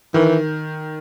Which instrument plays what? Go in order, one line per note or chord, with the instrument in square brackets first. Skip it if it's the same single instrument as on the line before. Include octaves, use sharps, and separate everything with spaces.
[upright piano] D#3 [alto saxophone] E3